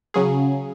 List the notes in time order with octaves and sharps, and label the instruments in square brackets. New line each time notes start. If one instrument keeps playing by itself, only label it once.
[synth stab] C#3 F#3 C#4 G#4